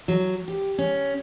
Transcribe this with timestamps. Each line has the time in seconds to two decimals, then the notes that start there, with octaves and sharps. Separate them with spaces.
0.08 F#3
0.48 G4
0.78 C#4